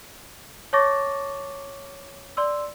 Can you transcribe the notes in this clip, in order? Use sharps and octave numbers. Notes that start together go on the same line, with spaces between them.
C#5 A5 C#6 D6 A6 A#6
D5 C6 E6